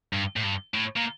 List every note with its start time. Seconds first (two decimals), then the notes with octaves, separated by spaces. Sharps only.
0.13 G2
0.36 A2
0.43 G2
0.74 A2
0.96 A#2